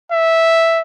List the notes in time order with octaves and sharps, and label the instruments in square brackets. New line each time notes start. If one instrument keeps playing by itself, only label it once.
[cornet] E5